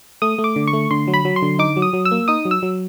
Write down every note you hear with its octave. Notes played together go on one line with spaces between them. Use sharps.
A3 D#6
A3
D6
D3
C#6
A3
D3 C6
F#3
B5
F#3
C6
D3
D#4 D6
F#3
D#6
F#3
E6
A#3
D#4 D#6
F#3
E6
F#3